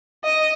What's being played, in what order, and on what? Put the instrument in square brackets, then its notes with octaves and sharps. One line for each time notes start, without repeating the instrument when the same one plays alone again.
[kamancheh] D#5